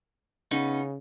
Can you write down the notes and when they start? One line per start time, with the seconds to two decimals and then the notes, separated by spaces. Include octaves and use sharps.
0.51 C#3 B3 C#4 D#4